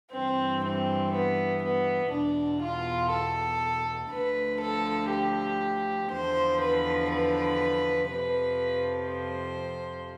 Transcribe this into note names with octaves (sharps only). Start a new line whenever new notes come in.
G2 E3 C4
C4
B3
B3
E2 B2 D4
F4
A4
D2 D3 F3 B4
A4
G4
E2 D3 F3 C5
B4
B4
F2 C3 F3 B4
C5